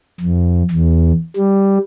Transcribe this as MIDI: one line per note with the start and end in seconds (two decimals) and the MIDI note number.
0.20 0.63 41
0.71 1.12 40
1.36 1.78 55